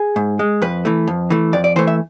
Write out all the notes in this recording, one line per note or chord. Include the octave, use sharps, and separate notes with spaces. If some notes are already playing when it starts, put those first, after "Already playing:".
Already playing: G#4
G#2
G#3
F2 B4
E3 A3
F2
E3 A3
F2 D5
D5
E3 A3 C5
E5